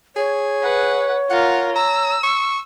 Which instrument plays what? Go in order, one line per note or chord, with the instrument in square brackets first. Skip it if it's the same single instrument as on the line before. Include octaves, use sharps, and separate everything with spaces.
[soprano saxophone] G#4 [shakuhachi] C#5
[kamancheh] B4 F#5
[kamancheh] F4 A#4 [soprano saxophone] F#5
[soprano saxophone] A#5 [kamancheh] E6
[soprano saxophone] C#6